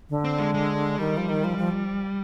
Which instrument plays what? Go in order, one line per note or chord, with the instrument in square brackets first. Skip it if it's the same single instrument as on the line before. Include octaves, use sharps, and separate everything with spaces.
[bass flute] D3
[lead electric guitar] C4
G#3
G#3
[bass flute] D#3 [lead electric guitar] G3
[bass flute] F3
D#3
F3
F3